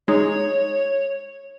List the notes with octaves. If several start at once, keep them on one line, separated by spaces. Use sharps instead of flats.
G#3 D#4 C#5